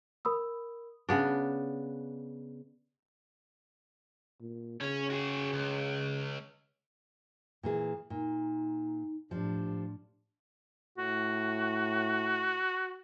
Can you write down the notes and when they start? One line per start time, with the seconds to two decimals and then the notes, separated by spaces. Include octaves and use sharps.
0.25 A#4 B5 D#6 E6
1.09 C#3 B3 D4
4.41 A#2
4.81 C#3 C#4
5.10 F#4 G#4
5.53 C#2
7.63 A#2 E3 G#4
8.10 A#2 D#4
9.31 A2 F3 D4 G4
10.98 A2 F#4